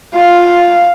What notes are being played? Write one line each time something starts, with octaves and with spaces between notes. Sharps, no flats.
F4 F5